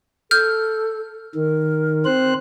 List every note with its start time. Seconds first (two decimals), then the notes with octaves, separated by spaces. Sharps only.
0.31 A4 F6 G6
1.35 D#3 A#4
2.05 C4 C5 F#6